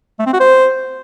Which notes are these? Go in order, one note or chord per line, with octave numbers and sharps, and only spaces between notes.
A3
C4
F#4
C5